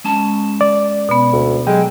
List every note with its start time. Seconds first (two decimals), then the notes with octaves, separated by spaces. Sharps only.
0.04 G#3 C#4 A5
0.61 D5
1.09 B2 B3
1.33 D2
1.67 F#3 G#3 G4 G5